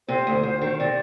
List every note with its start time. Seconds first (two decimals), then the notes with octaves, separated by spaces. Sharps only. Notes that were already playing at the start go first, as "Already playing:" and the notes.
0.08 C3 C5
0.27 D2
0.43 D2
0.61 D#3
0.79 C3 D5